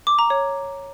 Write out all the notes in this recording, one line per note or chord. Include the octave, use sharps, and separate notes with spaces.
D6
A#5
C#5